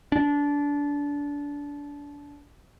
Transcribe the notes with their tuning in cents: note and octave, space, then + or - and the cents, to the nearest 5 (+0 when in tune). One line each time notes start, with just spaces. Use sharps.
D4 -25